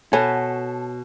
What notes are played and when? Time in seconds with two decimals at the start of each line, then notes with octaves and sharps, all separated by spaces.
0.13 B2 A4 C#5 G#5